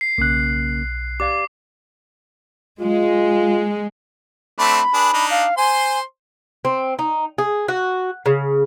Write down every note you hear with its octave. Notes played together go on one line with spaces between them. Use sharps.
C7
B1 C#3 A#3 F#6
G4 D5 F5 D6
G#3 F4
A3 C4 D4 B5
D4 G#4 B4
D4 D#4
F5
C5 G#5 C6
C4
D#4
G#4
F#4
C#3